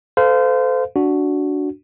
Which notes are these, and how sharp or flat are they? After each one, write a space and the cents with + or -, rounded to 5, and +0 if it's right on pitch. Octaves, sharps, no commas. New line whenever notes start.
A4 +0 C5 -30 F5 +0
D4 -15 F#4 +0